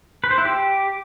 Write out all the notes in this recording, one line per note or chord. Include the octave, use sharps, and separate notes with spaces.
B4
C5
E4
G4